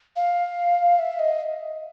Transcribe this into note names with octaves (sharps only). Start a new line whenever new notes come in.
F5
E5
D#5